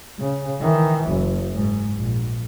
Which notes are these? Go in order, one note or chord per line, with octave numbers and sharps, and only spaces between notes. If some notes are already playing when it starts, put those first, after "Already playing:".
C#3
D#3 E3
F#1
G#2
A#1